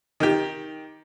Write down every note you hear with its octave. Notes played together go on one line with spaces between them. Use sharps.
D#3 G4